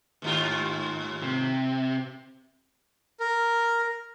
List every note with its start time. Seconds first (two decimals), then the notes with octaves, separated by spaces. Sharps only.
0.22 D#2 G#2 F4
1.22 C3
3.20 A#4